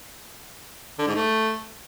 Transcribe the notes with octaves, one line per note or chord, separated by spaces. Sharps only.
D3
G#2
A3